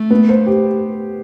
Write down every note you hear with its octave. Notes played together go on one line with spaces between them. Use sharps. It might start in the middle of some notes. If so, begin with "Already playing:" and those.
Already playing: A3
B3
C5
G4